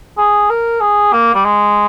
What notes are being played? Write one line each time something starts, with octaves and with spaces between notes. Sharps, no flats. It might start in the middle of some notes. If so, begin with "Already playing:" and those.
G#4
A#4
G#4
A#3
G3
G#3